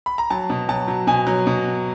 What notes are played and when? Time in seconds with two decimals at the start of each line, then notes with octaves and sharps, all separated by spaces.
0.06 B5
0.18 A#5
0.30 F#3 A5
0.50 B2
0.69 F#3 A5
0.88 F#3
1.07 B2 G#5
1.27 F#3
1.47 B2